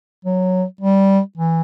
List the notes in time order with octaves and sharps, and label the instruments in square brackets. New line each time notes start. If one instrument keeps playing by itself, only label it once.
[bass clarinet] F#3
G3
E3